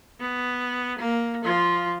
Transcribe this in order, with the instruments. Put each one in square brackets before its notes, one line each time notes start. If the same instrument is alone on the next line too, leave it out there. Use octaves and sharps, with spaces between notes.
[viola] B3
A#3
F3 F4